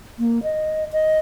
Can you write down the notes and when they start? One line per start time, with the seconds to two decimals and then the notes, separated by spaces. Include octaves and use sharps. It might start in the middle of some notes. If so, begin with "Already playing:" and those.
0.19 A#3
0.43 D#5
0.93 D#5